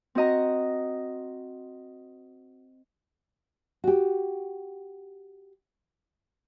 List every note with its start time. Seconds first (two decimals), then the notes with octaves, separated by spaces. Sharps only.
0.15 C4 F#4 D#5 A#5
3.84 F#4 G4